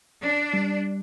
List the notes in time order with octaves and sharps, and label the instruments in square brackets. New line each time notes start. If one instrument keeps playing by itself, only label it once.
[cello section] D4
[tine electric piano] G3